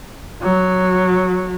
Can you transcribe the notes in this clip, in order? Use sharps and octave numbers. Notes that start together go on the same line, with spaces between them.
F#3